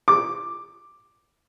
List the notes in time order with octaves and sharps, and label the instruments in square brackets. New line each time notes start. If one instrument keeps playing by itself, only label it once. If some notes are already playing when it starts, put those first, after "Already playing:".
[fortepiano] D6